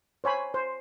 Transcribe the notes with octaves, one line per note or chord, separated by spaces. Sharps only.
C5 C#5 G#5 B5
C5